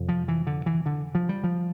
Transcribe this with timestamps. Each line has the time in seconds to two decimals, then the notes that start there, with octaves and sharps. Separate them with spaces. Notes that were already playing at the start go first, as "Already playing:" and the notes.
Already playing: F2 C3
0.09 F3
0.28 E3
0.47 D3
0.66 E3
0.86 D3
1.15 F3
1.29 G3
1.44 F3